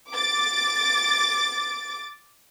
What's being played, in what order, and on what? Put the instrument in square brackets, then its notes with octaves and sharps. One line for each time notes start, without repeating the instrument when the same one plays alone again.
[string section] D6 A6